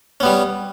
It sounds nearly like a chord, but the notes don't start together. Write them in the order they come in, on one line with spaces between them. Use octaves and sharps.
C#4 B3 G3